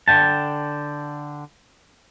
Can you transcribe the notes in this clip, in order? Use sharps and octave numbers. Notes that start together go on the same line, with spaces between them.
D3 G5 A5